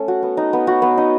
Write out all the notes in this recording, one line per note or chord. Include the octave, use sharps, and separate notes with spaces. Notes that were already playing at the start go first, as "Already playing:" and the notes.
Already playing: A3 C#4
F#4
B3
D#4
B3
F#4
B3
D#4